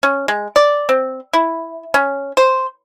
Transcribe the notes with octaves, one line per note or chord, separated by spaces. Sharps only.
C#4
G#3
D5
C4
E4
C#4
C5